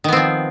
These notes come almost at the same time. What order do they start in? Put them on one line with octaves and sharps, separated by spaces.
D#3 B3 C4 F3